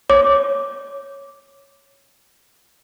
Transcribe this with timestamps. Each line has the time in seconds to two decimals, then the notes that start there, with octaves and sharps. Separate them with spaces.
0.10 C#5 D6